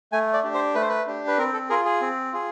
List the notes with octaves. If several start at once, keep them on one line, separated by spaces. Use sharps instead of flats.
A3 G#5
D5
D4 G4
C5
A3 B4
C5
B4
D4 G4
B4
C4 A#4
A4
F4 G#4 A#4
G#4
C4
F4 G#4